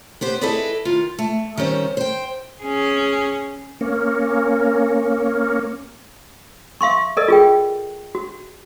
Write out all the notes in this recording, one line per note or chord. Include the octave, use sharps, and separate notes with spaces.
B3 G4 C5
E4 G#4 A4 B4 D5 D#5
D#3 F4
A3
D#3 G3 C#4 C5
C5 G5
C#4 G#4
A#3 C#4
E5 F5 C6 C#6
A4 A#4 D5 D#5
F4 G#4 G5
F#4